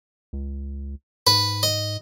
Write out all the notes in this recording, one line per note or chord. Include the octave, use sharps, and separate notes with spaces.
C#2
G#2 B4
D#5